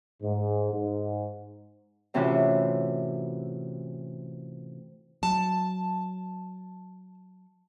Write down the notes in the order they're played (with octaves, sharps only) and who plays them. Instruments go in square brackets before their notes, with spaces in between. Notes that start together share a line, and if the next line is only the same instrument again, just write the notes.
[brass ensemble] G#2
G#2
[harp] A2 C3 E3 C#4 F4 F#4
[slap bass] F#3 [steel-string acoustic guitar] A5